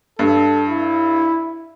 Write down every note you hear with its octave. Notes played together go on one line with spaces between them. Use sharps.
G2 A4
E4